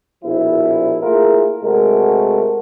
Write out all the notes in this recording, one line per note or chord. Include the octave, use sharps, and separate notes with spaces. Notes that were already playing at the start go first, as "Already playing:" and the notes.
A#1 B2 F3 E4
A3 A#3 E4 F4 G#4 A#4
C3 G#3 A3 F#4 A#4